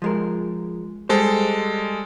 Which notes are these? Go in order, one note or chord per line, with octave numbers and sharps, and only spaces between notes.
F3 G#3 A#4
G3 G#3 A4 C5